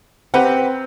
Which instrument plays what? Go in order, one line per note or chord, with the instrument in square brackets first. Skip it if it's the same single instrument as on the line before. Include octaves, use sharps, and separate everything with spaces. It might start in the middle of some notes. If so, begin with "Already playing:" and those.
[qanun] C4 A#5 [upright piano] G4 B4 F#5